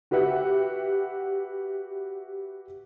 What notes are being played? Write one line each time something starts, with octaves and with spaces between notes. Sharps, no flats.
F#4 G4 B4 E5 F#5